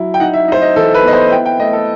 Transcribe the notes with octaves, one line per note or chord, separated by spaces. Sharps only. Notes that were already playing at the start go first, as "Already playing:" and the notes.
Already playing: F#3 E4
G5
D#4 F#5
E5
D#4 C5
D#5
E3 A4
B4
B3 D#5
C5
E4 G5
G5
A3 D#5
A4